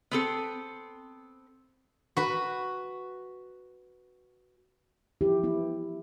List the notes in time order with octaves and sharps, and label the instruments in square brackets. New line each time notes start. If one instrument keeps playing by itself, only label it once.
[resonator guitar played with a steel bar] B3 C4 A4
[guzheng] F#4 B4
[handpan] E3 F3 E4 G4
B3 E4